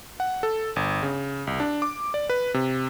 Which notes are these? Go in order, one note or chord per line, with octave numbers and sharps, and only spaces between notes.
F#5
A4
G1
C#3
C2
D4
D6
D5
B4
C3